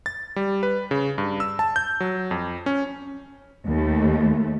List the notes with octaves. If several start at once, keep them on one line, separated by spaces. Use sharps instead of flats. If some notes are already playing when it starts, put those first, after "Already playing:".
A6
G3
B4
C#3
G2
E6
A5
G6
F#3
F2
C#4
D#2 A3